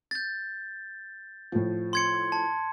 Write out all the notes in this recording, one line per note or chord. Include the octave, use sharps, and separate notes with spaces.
G6 A6
A2 F3
C6 G#6 C#7
A5